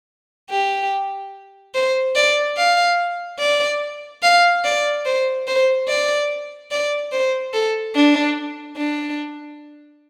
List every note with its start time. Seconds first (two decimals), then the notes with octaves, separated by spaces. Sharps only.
0.50 G4
1.75 C5
2.15 D5
2.57 F5
3.40 D5
4.23 F5
4.65 D5
5.06 C5
5.47 C5
5.88 D5
6.71 D5
7.12 C5
7.54 A4
7.95 D4
8.77 D4